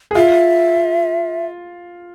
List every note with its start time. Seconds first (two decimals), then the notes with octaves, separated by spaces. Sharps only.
0.11 G#4
0.15 F4 E5